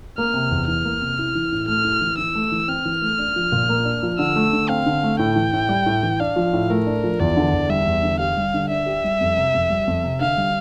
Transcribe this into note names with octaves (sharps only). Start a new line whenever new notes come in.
A#3 F6
C3
E2
E3 F6
A#3
C3
E4
E3
A2
A3 F6
E4
E3
E3 E6
A3
E3
C4 F6
E3
A3
D4
F3
A#2
A#3
D4
F3
D3 E6
A3
D3
C4 F5
D3
A3
A2 G5
E3
A2
G3
A2
E3
D4 F5
F3
A2
A3 A#4
D4
F3
E2 D5
D3
E2
G3 E5
E2
D3
G4 F5
G3
D3
D4 E5
G4
G3
F2
C3
F2
G3
F2
C3
D3 F5
G3